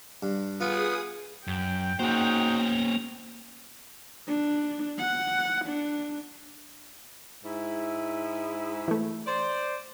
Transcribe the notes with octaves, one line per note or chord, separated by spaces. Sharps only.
G2
B3 F4 G#4 D#6
F#2 G5
A#3 C#4 D#4 F#4 G#4 C5
D4
F#5
D4
G#2 E4
E3 A3
C5 D5